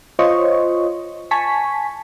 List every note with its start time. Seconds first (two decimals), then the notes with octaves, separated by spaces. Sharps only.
0.19 F4 C5 C#5 D#5 C#6
1.31 G#5 A5 C#6 B6